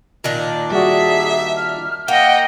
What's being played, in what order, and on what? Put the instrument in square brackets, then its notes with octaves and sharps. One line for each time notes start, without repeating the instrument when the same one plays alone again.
[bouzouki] A#2 D#3 D4
[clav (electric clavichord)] G3 F#4 [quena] G#4 [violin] E5
[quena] F6
[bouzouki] A#3 [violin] D#5 G5 [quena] F#5